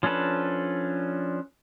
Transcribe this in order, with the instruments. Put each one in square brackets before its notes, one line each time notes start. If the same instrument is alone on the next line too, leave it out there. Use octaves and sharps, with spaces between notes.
[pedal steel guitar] F3 C#4 D4 A4 B4